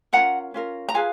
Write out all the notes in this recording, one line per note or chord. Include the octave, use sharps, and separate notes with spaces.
C#4 F4 A#4 F#5 A#5
C#4 F4 A#4
A#5
F4 G#4 B4 F5 G#5